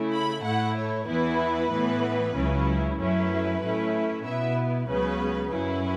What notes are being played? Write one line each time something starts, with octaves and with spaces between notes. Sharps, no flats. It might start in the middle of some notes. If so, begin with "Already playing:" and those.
Already playing: C#3 A3 E4
B5
A2 A3 E4 F#5
C#5
E2 E3 B3 E4 B4
A2 E3 B3 E4
C#2 C#3 F#3 C#4 E4
F#2 F#3 A3 C#4 E4 B4
A2 A3 C#4 E4
B2 B3 E4 E5
C#2 C#3 F#3 B3 B4
F#2 F#3 C#4 E4 B4